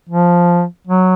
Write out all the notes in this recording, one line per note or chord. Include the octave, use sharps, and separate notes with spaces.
F3
F#3